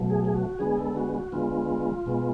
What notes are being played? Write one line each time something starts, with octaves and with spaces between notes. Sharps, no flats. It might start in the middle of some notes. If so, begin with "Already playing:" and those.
Already playing: B2 F#3 A3
G#4
G#4
F#4
D3 G#3 B3 G#4
A4
F#4
F#4
D3 G#3 B3 F4
B2 G#3 B3